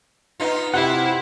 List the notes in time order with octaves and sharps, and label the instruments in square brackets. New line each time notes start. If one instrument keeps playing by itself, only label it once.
[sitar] B3 D#4 F4
[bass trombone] C3 [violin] E4 [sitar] F4 [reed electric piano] F#5